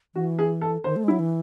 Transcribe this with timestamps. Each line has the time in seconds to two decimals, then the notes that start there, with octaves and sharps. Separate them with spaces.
0.15 E3 F#4
0.39 G#4
0.61 A4
0.84 D#3 C5
0.96 A3
1.04 G#3
1.08 E4
1.11 F#3
1.19 E3